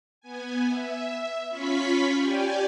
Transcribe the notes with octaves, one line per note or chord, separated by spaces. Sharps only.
B3 G#5
E5
C#4 F4 B5 C#6 B6
G4 D5 G5 G#5